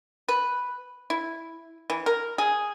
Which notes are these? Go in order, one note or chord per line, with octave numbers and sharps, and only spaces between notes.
B4
E4
E3
A#4
G#4